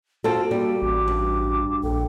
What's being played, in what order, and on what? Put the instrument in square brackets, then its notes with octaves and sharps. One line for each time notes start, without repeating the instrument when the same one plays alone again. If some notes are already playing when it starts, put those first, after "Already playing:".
[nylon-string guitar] C4 F4 A4 [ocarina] F#4
[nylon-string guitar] G3 [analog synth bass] A#3 [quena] A4
[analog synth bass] A1 [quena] D6
[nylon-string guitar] G2
[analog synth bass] A#1 [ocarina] A4 [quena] G5